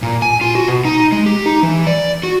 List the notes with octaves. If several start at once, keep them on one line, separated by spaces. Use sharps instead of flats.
A#2
G#5
F4
F#4
B2
D#4
G#3
G4
D#4
E3
D5
F#4